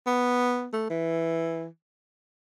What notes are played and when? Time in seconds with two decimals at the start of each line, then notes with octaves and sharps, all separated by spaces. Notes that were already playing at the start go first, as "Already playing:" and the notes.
0.06 B3
0.73 A3
0.90 E3